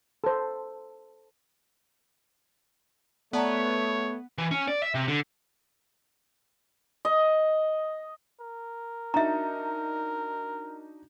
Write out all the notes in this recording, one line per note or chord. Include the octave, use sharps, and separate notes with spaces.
A4 C5
A3 B3 C#5 D5 A5 A#5
E3
C#4
D5
E5
C3
D3
D#5
A#4
D4 D#4 F#4 E5 A#5